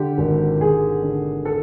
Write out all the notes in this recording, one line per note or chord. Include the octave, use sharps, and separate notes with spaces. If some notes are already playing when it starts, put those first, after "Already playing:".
Already playing: D3 G4
G#1
G#1 G#4
D3
A4